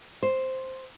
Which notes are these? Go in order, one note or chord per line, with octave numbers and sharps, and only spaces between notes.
C5